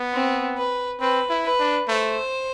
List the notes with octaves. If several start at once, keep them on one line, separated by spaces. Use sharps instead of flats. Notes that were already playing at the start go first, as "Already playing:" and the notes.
Already playing: B3
C4
B4
C4 B4
E4
B4
D4
A3 C5